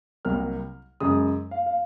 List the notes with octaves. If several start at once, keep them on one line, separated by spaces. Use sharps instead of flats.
C2 C3 F#3 A#3 F6
F#2 C#3 G#3 D#6
F5
F5